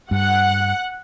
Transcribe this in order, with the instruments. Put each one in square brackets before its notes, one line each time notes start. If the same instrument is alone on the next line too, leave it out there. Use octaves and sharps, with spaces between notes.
[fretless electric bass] G2 [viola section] F#5